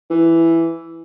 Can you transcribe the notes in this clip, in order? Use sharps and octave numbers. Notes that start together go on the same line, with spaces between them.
E3